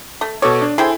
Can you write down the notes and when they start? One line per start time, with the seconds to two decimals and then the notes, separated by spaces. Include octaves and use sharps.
0.21 A3
0.42 B2 A4 C#5 D6
0.62 D4
0.78 E4 G#4 A4 C5 G5